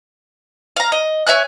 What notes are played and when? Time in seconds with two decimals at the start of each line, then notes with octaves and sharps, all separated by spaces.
0.76 F5 A#5
0.92 D#5
1.27 C#5 E5 G#5 F#6